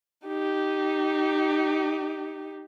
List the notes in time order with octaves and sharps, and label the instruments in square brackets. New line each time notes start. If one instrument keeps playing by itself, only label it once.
[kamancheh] D#4 G4